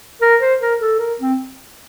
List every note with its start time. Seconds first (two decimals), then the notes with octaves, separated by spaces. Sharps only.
0.22 A#4
0.41 C5
0.61 A#4
0.81 A4
0.99 A#4
1.20 C4